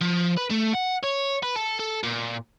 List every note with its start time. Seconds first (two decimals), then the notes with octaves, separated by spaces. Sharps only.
0.02 F3
0.38 B4
0.51 A3
0.75 F#5
1.04 C#5
1.43 B4
1.55 A4
1.79 A4
2.04 A#2